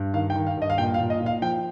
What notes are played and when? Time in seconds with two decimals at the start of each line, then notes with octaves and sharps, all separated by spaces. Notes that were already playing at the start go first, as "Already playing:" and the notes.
Already playing: G2
0.14 D#3 F5
0.30 G5
0.35 D#3
0.47 F5
0.57 G2 D#5
0.70 F5
0.78 A#2 G5
0.94 F5
0.99 A#2
1.10 D#5
1.21 A#2
1.26 F5
1.42 F3 G5